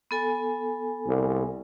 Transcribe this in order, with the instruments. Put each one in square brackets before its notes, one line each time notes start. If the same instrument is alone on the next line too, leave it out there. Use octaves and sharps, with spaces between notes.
[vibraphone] B3 A4 G#5
[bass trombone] C2